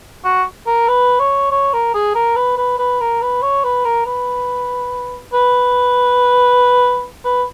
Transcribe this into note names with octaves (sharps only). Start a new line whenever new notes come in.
F#4
A#4
B4
C#5
C#5
A#4
G#4
A#4
B4
B4
B4
A#4
B4
C#5
B4
A#4
B4
B4
B4